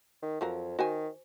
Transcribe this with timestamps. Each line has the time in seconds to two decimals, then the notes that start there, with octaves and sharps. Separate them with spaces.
0.22 D#3
0.41 F2 F3 F#3 A#4
0.79 D#3 F#4 C5 G#5